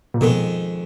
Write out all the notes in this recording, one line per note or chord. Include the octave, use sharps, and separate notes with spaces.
A#2
F2 B2 D#3 G#3